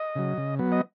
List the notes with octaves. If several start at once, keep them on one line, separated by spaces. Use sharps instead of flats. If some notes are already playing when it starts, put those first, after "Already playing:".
Already playing: D#5
C#3 F#3
C#3
F#3 B3
D#5